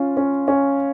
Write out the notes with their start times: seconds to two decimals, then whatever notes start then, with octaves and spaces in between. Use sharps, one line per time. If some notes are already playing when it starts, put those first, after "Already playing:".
Already playing: C#4 F4
0.17 C#4
0.48 C#4